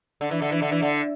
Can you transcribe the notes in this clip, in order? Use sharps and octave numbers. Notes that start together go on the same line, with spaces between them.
D3
E3
D3
E3
D3
E3
D3